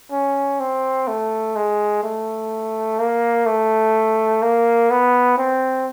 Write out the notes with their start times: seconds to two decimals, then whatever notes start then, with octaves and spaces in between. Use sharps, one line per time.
0.12 C#4
0.60 C4
1.08 A3
1.56 G#3
2.03 A3
2.99 A#3
3.46 A3
4.42 A#3
4.91 B3
5.38 C4